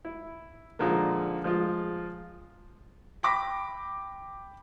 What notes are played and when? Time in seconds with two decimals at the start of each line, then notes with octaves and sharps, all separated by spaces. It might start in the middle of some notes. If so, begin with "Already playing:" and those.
0.05 E4
0.79 A#2 D3 F3 G#3 A#3
1.44 F3 G#3 F4
3.23 G5 B5 D6 A#6 B6